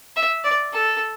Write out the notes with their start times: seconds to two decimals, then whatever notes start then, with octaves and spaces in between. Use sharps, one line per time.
0.16 E5
0.44 D5
0.73 A4